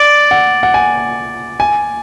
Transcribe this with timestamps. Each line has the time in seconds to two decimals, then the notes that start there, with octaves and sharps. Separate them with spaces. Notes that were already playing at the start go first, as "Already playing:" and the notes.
Already playing: D5 D6 A6 D7 F#7
0.31 F#5
0.63 F#5
0.74 G#5
1.60 G#5